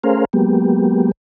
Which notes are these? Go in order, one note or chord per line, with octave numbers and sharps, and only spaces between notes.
A3 C#4 G#4 A#4 C5 F5
F#3 G#3 A#3 B3 G4